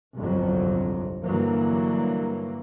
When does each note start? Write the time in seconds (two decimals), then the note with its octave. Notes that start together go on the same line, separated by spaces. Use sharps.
0.17 G1 C2 F2 F#3
1.25 G2 D3 E3 F#3 A#3